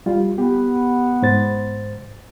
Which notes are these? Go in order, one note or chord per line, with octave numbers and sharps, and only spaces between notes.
G3 F4
B3 G4
G#2 C5 A6